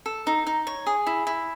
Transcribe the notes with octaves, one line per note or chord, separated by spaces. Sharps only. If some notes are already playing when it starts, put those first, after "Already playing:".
A4
D#4
D#4
C#5
G#4
E4
E4